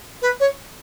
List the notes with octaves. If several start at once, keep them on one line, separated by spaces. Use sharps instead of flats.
B4
C#5